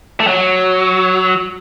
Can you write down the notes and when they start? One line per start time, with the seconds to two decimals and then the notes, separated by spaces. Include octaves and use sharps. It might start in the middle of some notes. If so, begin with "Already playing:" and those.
0.20 A3
0.27 F#3